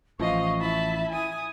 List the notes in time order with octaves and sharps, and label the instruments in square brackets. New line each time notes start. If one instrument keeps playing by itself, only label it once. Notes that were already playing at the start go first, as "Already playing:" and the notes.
[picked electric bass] A1 E3 F3 [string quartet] D#5 F5 [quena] C#6
[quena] E4 [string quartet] E5 A5 B5
[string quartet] G#5 D#6